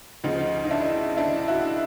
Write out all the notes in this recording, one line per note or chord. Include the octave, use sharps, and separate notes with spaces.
D2 C#3 F3 D#4
D#4
D4 E4
D4 E4
E4 F#4